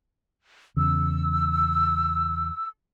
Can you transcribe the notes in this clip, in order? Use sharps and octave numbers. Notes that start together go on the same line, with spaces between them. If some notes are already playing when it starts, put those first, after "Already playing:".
E2 C#3 E6